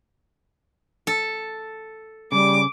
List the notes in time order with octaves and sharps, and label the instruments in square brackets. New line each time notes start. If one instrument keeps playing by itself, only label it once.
[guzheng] A4
[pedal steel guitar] C#3 [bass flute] G3 [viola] D6